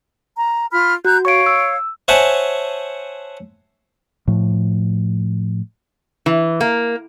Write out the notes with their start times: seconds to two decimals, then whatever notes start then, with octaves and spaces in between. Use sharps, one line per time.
0.36 A#5
0.71 F4 B5 F6
1.05 F#4 A#5 F#6 G6
1.25 C#5 F5 C#6 D7
1.46 E6
2.08 C5 C#5 E5 F#5 G#5 A5
4.28 A2 F3
6.26 E3
6.61 A#3